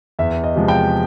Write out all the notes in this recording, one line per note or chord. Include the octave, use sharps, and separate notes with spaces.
E2 E5
D#5
C3 F3 G#3
G5